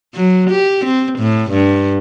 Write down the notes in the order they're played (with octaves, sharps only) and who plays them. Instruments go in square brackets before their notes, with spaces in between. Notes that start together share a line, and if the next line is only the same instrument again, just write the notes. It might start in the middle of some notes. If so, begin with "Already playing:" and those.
[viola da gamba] F#3
G4
C4
A2
G2